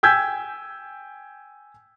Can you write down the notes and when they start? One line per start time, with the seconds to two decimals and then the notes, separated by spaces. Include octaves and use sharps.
0.03 G5 G#5 E6 G6 G#6 B6